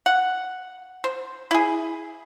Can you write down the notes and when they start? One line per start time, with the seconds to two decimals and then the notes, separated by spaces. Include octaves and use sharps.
0.06 F#5
1.04 C5
1.51 E4 G#4